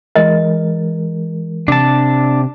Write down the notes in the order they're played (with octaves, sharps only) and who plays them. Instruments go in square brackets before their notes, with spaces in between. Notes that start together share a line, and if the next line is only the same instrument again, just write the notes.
[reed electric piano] E3 G#3 A#4 [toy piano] D#5
[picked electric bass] C3 [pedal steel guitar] D4 A5